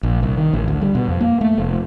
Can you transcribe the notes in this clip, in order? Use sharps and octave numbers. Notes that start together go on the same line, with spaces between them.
A#1
C2
D#3
A1
D2
G3
B2
F2
A#3
A3
F1